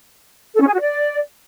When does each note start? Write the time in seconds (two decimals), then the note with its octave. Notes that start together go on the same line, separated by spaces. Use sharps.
0.55 A4
0.61 C#4
0.67 G#4
0.73 F#4
0.80 D5